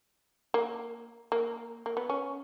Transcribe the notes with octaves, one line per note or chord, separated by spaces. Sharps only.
A#3
A#3
A#3
B3
C#4